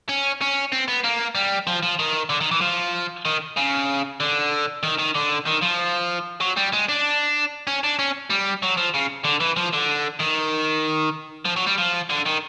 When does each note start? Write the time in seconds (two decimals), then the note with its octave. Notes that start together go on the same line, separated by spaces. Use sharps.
0.09 C#4
0.41 C#4
0.72 C4
0.88 B3
1.04 A#3
1.35 G3
1.67 F3
1.83 F3
1.99 D#3
2.30 D3
2.41 D#3
2.51 E3
2.61 F3
3.25 D#3
3.57 C#3
4.20 D3
4.83 D#3
4.99 D#3
5.15 D3
5.46 D#3
5.62 F3
6.41 F#3
6.57 G3
6.73 G#3
6.89 D4
7.67 C#4
7.84 D4
7.99 C#4
8.30 G3
8.63 F#3
8.77 F3
8.94 C#3
9.25 D3
9.40 E3
9.57 F3
9.73 D3
10.20 D#3
11.46 F3
11.57 F#3
11.67 G3
11.78 F3
12.10 D3
12.26 D#3